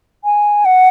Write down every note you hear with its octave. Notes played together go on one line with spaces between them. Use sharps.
G#5
F#5